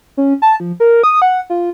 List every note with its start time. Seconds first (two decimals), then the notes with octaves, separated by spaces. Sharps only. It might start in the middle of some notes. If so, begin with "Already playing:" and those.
0.17 C#4
0.42 A5
0.60 F3
0.80 A#4
1.04 D#6
1.22 F#5
1.50 F4